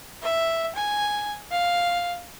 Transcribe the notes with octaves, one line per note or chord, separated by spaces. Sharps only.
E5
G#5
F5